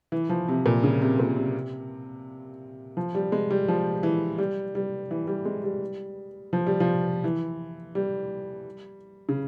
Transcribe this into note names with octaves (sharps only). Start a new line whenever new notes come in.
E3
F3
C3
A#2
C#3
C3
A#2
C3
F3
G3
G#3
G3
F3
E3
G3
G3
E3
G3
G#3
G3
F3
G3
F3
E3
G3
C#3